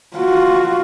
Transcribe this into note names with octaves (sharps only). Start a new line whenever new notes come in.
F4 F#4